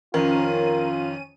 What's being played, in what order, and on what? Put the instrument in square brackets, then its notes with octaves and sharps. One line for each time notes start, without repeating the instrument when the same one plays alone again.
[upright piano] F2 D#3 [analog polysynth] C#4 D#7 [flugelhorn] F4 [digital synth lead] A#4